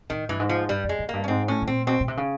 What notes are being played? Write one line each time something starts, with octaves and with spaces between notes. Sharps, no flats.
A2 D#3
G2 E3
G#2
F3
G2 G3
F2
G#3
F#2
G2 A#3
C#4
G#2 C4
A2 C#4
B2
A#2 C4
B2 C4
B2
C3
C#3